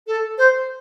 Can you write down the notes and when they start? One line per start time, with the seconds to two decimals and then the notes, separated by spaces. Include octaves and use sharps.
0.07 A4
0.38 C5